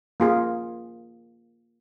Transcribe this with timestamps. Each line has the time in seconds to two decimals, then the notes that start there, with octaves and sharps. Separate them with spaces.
0.20 A#3 F4 G#4